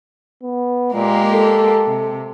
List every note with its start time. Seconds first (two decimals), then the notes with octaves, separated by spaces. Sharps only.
0.43 B3
0.94 A#2 G#3 A#3 G4
1.33 A4
1.88 C3